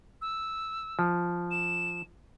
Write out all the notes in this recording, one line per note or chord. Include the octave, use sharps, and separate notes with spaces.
E6
F3
E7